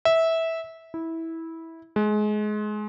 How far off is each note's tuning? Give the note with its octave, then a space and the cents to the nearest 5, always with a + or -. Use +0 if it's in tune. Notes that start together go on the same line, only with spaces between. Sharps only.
E5 -15
E4 -15
G#3 +25